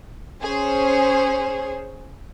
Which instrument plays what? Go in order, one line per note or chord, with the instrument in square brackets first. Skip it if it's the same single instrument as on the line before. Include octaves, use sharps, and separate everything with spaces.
[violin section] C#4 G#4 C5 C#5